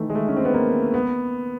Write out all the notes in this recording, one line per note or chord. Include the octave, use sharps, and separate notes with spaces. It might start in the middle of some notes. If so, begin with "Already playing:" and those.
Already playing: D#3 E3 A3
G#3
A3
C#4
C4
B3
A#3
B3